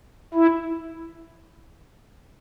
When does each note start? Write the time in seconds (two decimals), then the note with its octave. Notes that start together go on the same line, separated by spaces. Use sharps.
0.34 E4